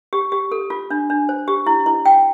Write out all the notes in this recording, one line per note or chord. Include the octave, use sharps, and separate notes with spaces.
G4
G4
A4
F4
D4
D4
C5
G4
E4
E4
G5